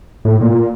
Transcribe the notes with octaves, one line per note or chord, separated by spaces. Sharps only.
A2
A#2